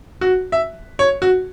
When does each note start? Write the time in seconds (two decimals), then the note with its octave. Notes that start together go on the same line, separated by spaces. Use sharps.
0.21 F#4
0.52 E5
0.99 C#5
1.22 F#4